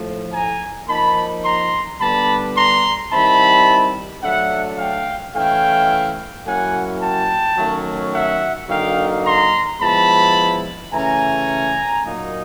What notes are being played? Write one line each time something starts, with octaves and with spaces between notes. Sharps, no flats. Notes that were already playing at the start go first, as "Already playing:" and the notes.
Already playing: A2 F3 A3
G#5 A#5
F3 A#3 D#4 A5 B5
A#5 C6
D3 G3 B3 D4 A5 B5
A#5 C6
D#3 G3 C4 E4 A5 B5
F#3 A3 D4 E5 F#5
F5 G5
E3 A3 C#4 E4 F5 G5
F#3 A#3 C#4 E4 F#5 G#5
G5 A5
D#3 F#3 A3 C#4
E5 F#5
D3 F#3 A#3 D#4 F5 G5
A#5 C6
F3 G#3 B3 E4 A5 B5
C#3 E3 A3 C#4 G#5 A#5
A#2 F#3 A#3 D#4